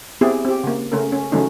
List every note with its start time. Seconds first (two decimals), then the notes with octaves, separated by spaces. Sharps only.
0.21 B3 C4 E4 G4 G#4
0.45 C4 G4
0.64 C#3 A#3
0.92 C#3 A3 C#4 A#4
1.12 C#4
1.32 C#3 E3 F#3 A3 C#4 D#4